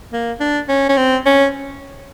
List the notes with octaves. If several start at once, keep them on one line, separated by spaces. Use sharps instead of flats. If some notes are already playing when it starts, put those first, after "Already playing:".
A#3
D4
C#4
C#4
C4
C#4